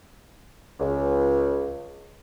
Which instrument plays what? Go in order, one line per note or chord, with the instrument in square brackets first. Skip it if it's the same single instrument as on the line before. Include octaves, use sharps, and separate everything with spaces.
[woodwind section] C#2